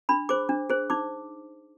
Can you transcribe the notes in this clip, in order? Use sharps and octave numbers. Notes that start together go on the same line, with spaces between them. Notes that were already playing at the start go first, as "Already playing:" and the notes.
D4 B5
G#4 C5 D6
D4
G#4 C5
D#4 D6